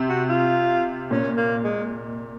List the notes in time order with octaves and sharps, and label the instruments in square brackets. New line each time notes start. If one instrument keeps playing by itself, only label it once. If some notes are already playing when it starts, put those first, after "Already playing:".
Already playing: [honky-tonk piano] C3
[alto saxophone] F#4
F4
[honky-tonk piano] A#2 [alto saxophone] C#4
[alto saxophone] A#3
G#3